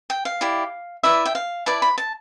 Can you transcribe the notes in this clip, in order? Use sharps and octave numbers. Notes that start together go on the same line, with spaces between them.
G5
F5
E4 G4 D5
E4 B4 D5 E5
G5
F5
E4 B4 D5 A5
B5
A5